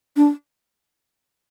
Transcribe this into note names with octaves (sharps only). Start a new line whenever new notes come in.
D4